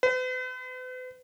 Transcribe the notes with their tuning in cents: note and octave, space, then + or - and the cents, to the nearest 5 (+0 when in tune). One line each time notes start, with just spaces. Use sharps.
B4 +45